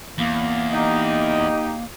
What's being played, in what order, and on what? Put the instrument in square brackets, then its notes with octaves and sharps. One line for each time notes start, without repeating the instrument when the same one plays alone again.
[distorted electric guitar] E2 [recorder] A#3
[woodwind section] D#4 G4 [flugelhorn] D#5